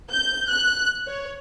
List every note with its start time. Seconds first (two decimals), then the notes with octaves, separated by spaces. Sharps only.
0.12 G6
0.49 F#6
1.08 C#5